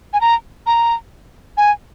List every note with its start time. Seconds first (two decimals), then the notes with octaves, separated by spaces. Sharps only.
0.13 G#5
0.21 A#5
0.67 A#5
1.57 G#5